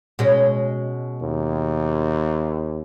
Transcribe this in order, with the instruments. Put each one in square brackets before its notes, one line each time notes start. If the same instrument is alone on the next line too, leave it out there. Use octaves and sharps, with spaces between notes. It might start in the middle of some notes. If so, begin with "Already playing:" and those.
[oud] B2 G#3 C#4
[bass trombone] D#2